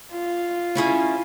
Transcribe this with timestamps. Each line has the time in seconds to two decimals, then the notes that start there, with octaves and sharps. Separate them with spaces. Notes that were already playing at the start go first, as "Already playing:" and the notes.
0.12 F4
0.75 C#4 E4 G#4